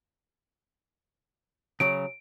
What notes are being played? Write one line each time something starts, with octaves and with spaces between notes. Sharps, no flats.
C#3 F#3 D7